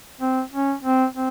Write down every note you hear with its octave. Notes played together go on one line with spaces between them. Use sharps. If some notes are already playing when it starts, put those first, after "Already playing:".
C4
C#4
C4
C4